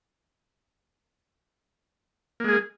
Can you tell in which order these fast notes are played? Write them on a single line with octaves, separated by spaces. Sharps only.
A#3 G#3 G#4